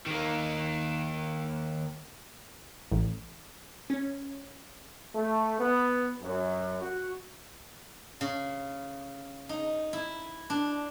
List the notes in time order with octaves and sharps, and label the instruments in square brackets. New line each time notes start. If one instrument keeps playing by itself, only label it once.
[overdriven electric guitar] D#3 A#3
[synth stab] A1
C#4
[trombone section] A3
B3
F#2
F#4
[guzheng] C#3
D#4
E4
D4